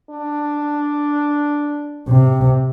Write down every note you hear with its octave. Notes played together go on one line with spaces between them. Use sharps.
D4
C3